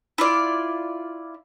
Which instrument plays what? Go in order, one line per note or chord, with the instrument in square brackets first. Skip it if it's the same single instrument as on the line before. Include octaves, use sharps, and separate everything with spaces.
[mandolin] E4 F4 D5